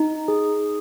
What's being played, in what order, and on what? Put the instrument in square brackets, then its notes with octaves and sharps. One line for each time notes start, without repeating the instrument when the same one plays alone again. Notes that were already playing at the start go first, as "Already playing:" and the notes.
Already playing: [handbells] D#4
G#4